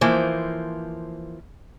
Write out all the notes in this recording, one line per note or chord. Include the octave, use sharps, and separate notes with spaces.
E3 F3 A#3 C5